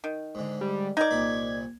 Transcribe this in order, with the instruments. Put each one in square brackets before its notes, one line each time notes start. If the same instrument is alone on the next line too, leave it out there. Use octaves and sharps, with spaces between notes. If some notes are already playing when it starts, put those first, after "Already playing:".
[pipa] D#3
[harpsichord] G#2 D3
[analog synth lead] G3
[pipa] D#4 D5 [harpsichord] A#4 [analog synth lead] G#6
[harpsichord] C2 A#2 B5